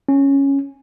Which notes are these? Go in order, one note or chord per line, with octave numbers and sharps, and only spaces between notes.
C#4